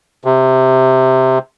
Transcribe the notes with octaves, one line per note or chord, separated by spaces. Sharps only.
C3